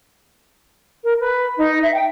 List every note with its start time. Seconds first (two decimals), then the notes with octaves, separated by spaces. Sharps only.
1.03 A#4
1.19 B4
1.57 D#4
1.82 E5
1.94 G5